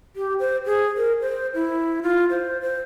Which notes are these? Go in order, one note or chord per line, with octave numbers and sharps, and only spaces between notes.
G4
C5
G#4
A#4
C5
E4
F4
C5
C5